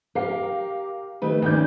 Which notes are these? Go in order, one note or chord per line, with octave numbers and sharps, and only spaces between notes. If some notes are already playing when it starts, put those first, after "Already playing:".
G4 A#4 F5 C7
D#3 A3 G4 B4
D2 D#3 A#3 C#4 D5 G6